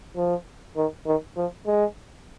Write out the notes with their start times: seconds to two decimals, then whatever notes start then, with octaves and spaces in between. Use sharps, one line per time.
0.16 F3
0.76 D#3
1.06 D#3
1.37 F3
1.66 G#3